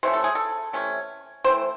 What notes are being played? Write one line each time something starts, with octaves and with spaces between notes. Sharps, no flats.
C3 E3 A3 C#4 C5
A4
G#4
A4
C3 E3 A3 C#4
E3 A3 C4 C5